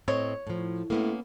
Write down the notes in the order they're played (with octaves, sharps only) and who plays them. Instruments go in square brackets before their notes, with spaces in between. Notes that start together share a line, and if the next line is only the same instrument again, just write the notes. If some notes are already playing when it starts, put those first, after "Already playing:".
[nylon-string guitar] A2 C4 D#5 [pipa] C#5
[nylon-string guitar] A2 F3
[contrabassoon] A2 [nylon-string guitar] A#3 B3 C#4